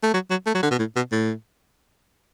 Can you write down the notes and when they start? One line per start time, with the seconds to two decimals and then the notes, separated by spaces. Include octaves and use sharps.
0.03 A3
0.14 F#3
0.31 F#3
0.46 A3
0.55 F#3
0.63 D3
0.71 B2
0.79 A2
0.96 B2
1.12 A2